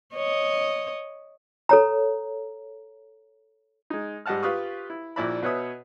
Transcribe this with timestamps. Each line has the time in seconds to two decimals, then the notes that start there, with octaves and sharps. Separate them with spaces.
0.14 C#5 D#5
1.69 A4 C#5 A#5
3.90 G#3 D#4
4.26 G#2 G3 D#5 F#5 A5 F6
4.43 F4 G4 B4 F5 C#6 D#6
4.90 E4
5.16 A#1 A#2 E4 D5 E5 B5
5.43 B2 B4 C#5 E5 D#6